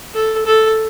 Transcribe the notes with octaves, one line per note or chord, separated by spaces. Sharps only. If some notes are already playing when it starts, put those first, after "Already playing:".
A4
A4